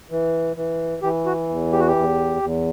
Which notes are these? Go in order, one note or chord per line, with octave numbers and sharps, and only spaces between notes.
E3
E3
E3 G4
F#4
E2
G4
F#4
G4
E2
E2